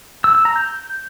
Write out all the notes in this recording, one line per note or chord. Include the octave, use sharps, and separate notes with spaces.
E6
E6
A#5
G6